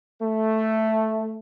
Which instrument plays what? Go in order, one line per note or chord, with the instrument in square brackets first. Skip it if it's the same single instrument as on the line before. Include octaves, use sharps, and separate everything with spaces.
[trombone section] A3